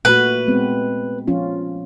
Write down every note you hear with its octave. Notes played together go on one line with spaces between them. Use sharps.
A#2 A3 F#4 B4
G#3 B3 C4
F3 C#4 F4